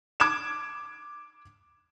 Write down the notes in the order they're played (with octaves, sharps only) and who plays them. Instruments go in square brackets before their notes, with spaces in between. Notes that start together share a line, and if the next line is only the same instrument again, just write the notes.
[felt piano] D6 G#6 E7